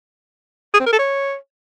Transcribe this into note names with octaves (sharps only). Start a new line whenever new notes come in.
G#4
C4
A#4
A4
C#5